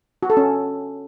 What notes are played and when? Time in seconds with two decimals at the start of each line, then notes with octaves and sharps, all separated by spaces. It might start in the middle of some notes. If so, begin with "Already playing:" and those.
0.23 F#4
0.30 A4
0.37 C#4